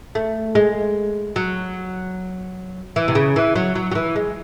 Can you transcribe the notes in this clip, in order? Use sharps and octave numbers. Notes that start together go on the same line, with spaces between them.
A3
G#3
F#3
E3
C3
C#3
E3
F#3
F#3
F#3
E3
G#3